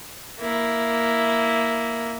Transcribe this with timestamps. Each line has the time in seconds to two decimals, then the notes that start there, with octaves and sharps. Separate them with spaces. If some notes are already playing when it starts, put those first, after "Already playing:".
0.40 A#3 E4